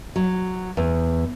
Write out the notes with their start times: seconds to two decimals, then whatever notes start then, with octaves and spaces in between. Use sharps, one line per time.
0.16 F#3
0.77 E2